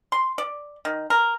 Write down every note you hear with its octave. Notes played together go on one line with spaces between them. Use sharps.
C6
D5
D#3
A#4